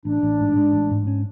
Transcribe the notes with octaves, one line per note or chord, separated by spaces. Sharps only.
A1 D4
A1
G#2
G#3
A1
G#2
C#4